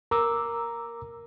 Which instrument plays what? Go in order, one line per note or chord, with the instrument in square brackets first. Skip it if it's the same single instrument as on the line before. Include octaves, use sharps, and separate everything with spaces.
[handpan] A#4 [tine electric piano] A#5 D6 E6